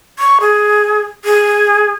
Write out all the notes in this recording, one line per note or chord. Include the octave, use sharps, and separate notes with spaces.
C#6
G#4
G#4